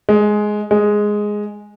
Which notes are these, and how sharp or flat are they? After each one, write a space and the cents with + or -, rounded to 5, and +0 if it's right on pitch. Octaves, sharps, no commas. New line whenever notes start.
G#3 +10
G#3 +0